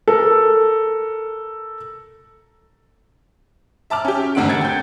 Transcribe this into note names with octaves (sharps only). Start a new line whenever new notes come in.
A4 A#4
E5 A5 D6 F6
C#4 G4
G#1 D2 D3 F#5 D7
G#6 A6 C#7
G5 G6